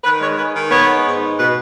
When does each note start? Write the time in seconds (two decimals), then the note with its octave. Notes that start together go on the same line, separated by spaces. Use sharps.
0.04 D#3 B4
0.21 G#3 C#5
0.38 G#3 B4
0.54 D#3
0.71 B3 C#5
0.88 G#3
1.04 G#2
1.22 G#3
1.38 B2 B4